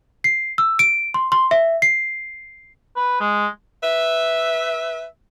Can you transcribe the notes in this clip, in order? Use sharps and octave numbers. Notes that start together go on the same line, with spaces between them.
C7
E6
D7
C6
C6
E5
C7
B4
G#3
B4 E5